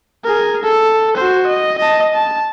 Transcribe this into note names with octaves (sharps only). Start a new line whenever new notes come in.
G#4 A#4
A4
F#4 C5
D#5
D#5 A5
A5